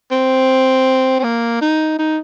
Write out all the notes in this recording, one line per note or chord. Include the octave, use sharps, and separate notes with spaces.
C4
C4
A#3
D#4
D#4